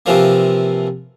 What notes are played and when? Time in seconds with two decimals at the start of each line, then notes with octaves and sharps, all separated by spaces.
0.06 C3 E3 F3 A#3